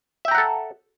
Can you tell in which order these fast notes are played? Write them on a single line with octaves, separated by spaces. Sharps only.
E5 G5 A#5 F#5 A4